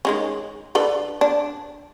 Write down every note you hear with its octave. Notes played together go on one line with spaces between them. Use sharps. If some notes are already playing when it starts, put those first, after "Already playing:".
D#3 G#3 C#4
D3 A4 B4
D4